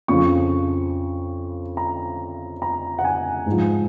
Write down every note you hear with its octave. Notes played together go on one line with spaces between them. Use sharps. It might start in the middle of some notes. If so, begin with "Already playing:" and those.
F2 C#3 F3 C#6
A#5
A#5
F#5
G#5
G#2 F3